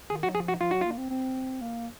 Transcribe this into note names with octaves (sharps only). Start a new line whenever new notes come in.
D#3 G#4
F#3 F#4
F3 G#4
F#4
F3 F4
F#3 F#4
F4
A#3
C4
C4
A#3